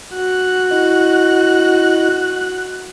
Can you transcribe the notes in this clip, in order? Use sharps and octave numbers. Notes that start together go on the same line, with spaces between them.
F#4 F#6
E4 D#5